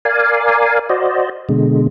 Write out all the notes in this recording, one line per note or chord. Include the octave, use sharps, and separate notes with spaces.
A#4 D5 F5 G#5
F#4 C5 D5 D#5
B2 D3 G#3